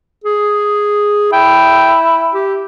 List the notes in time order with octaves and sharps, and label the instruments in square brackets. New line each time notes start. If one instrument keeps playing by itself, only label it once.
[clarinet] G#4
[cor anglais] E4 [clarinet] G5
[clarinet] G4